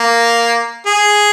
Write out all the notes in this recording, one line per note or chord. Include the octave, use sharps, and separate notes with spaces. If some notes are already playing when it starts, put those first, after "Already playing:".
Already playing: A#3
G#4